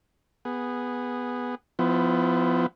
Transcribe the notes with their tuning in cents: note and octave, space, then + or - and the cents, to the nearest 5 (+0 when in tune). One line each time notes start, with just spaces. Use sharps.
B3 +0 G#4 -15
F3 +0 B3 +30 E4 +0